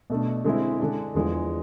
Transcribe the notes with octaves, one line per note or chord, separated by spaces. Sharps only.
B2 A3 D4
D3 G#3 C4 E4
D3 G#3 D4
E2 D3 F3 G#3